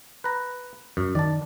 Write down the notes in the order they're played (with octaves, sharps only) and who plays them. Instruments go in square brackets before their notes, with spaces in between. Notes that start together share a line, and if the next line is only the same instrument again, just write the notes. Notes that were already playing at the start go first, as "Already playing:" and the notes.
[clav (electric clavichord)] B4 A#5
F#2
[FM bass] D#3 [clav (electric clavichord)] D5 A5